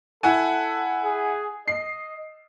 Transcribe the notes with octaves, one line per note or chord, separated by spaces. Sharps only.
E4 A4 F#5 G#5
G#4
D#5 C7